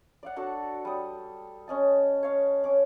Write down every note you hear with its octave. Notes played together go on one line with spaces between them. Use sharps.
D5 F5 F#5
D4 F#4 A4 A5
G3 D#6
C#4 D#5 A5
C#5 F5
C#4 D6